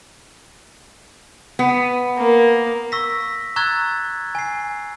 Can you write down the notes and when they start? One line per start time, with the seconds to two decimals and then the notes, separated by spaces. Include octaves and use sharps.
1.59 B3
2.18 A#3
2.92 C#6 E6 A#6 B6
3.56 A#5 C#6 E6 F#6 G#6 A6
4.35 G#5 C7